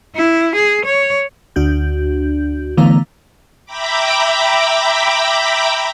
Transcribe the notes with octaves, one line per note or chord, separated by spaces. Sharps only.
E4
G#4
C#5
D2 D4 F#4 G6
D3 E3 A3 B3 F5 A#5
E5 G5 A#5 B5 D6